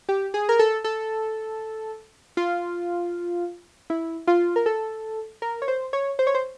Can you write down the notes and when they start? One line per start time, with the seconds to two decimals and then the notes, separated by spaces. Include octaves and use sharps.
0.09 G4
0.34 G#4
0.49 A#4
0.59 A4
0.84 A4
2.37 F4
3.90 E4
4.27 F4
4.56 A#4
4.66 A4
5.42 A#4
5.62 C#5
5.68 C5
5.93 C#5
6.19 C5
6.27 C#5
6.35 C5